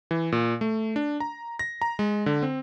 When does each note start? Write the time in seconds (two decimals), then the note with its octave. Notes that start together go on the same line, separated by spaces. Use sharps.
0.11 E3
0.32 A#2
0.61 A3
0.96 D4
1.20 A#5
1.59 A#6
1.82 A#5
1.99 G#3
2.26 D3
2.43 C4